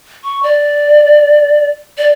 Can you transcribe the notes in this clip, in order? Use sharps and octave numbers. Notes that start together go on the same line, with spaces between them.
C#6
D5
D5